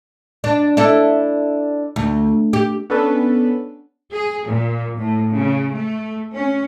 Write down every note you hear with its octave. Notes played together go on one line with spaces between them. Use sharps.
D4
D4 E4 A4
D2
G4
B3 C#4 D4 A4 B4
G#4
A#2
A2
C#3
A3
C#4